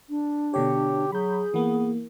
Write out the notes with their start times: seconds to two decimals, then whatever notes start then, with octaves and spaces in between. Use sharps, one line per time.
0.10 D4
0.54 B2 D3 G4 C#5
1.12 F#3 G#4 B5 G6
1.54 E3 A#3 B3